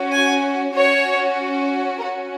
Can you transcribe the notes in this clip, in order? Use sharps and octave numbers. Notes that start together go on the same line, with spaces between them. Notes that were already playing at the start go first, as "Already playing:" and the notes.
Already playing: C#4 F#4
G#5
C#4 F#4 C#5
C#4 F#4 A#4